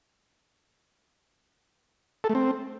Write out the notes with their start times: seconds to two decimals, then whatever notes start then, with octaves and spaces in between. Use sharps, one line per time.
2.24 A4
2.29 A3
2.35 C4